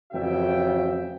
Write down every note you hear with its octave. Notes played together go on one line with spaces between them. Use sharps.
A1 F2 C#3 F#4 E5 G5